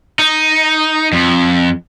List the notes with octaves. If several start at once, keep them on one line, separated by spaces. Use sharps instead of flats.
D#4
F2